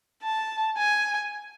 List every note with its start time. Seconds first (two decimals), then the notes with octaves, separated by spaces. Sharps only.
0.23 A5
0.78 G#5